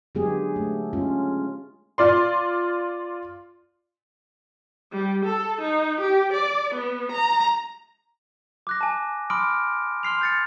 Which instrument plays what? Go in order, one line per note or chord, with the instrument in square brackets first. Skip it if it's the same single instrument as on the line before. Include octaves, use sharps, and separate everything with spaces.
[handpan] D3 F#3 G#3 B3 G4 G#4
A3
G#3 C#4 F4
[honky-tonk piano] F4 D5 C6
[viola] G3
A4
D#4
G4
D5
B3
A#5
[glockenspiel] D6 F#6 A#6
G#5 A5
B5 C6 D6 D#6 F6 D7
C6 F6 C7 F7
G6 A6 C#7